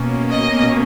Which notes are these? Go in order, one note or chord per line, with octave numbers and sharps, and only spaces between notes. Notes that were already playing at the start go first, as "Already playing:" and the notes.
Already playing: B2 A#3 C#4
D#5